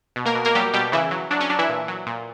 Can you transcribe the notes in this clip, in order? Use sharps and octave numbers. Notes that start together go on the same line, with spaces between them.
B2
A#3 A#4
B2
A#3 A#4
F#3 G3 G4
B2 G3 G4
C#3 E3 E4
F#3
F#3 D4
C#4
F#3 D4
E3 E4
A#2
F#3
A#2